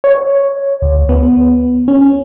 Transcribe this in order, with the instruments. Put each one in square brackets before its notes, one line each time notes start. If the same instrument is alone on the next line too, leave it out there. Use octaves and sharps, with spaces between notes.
[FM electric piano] C#5
D2
B3
C#4